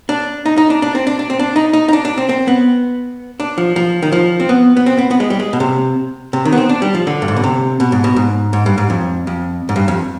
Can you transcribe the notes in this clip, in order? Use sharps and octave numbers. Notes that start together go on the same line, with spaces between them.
D4
D#4
D#4
D4
D4
C4
D4
D4
C4
D4
D#4
D#4
D#4
D4
D4
C4
C4
B3
D4
F3
F3
D#3
F3
C4
B3
B3
C4
B3
B3
G#3
G3
G#3
B2
C3
C3
D#3
B3
C4
D4
G3
F3
D3
G2
G#2
B2
C3
B2
G#2
B2
G#2
G#2
G2
G#2
F2
F2
G#2
G2
F2